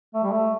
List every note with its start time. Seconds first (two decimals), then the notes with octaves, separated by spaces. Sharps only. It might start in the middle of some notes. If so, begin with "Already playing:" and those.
0.14 A3
0.23 G3
0.31 A3